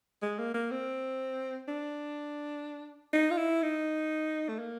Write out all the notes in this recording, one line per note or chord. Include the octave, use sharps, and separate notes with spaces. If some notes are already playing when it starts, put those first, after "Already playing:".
G#3
A#3
A#3
C4
D4
D#4
F4
E4
D#4
A3
A#3